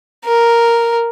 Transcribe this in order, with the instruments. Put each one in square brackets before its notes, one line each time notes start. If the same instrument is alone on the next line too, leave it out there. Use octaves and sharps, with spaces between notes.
[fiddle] A#4